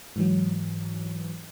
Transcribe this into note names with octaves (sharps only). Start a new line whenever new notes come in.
G#2 E3 F#3